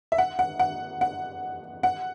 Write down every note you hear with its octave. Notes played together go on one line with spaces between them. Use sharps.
E5
F#5
F#5
F#5
F#5
F#5